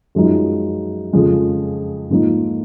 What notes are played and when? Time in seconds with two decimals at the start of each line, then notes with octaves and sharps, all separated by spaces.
0.15 F#2 F3 G#3 D#4
1.13 F2 C#3 F3 G#3
2.10 G#2 F3 A#3 D#4